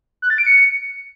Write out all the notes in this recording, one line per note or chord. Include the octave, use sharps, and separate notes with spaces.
F#6
A6
D7
C#7